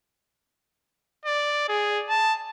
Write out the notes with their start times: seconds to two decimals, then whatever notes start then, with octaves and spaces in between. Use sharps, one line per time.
1.26 D5
1.69 G#4
2.09 A5